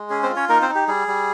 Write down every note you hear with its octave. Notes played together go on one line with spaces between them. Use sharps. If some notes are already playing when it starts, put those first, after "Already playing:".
Already playing: G#3
C#4 G#4
C4 C5
F4
C#4 C#5
A#3 D#4 A#4
C4 C5
D#4
G4
G3 G#4
G3